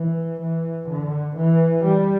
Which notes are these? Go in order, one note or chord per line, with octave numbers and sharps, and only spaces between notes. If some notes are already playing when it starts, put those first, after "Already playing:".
Already playing: E3
E3
D3
E3
G3